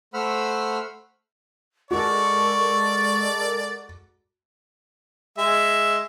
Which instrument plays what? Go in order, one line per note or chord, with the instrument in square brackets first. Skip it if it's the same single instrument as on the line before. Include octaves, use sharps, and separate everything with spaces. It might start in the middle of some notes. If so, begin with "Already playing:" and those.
[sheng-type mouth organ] A3 C5 F#5 B5 E6 F6
[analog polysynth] G#3 A4 A#4 [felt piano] F#4 [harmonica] D5 [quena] C#6
[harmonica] G#3 E5